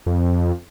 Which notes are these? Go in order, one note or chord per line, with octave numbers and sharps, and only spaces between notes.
F2